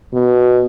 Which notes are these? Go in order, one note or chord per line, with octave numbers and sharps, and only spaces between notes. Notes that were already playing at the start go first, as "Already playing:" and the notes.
B2